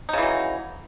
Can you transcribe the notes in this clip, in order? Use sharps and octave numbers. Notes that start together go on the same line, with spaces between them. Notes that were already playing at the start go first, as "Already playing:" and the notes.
C#3 E3 F#3 D#4